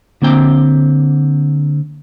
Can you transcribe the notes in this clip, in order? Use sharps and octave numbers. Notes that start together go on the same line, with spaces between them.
D3 A#3 C4 G5